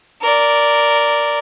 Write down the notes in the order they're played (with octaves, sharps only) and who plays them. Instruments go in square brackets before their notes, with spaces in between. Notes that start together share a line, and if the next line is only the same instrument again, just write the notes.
[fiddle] A#4 D5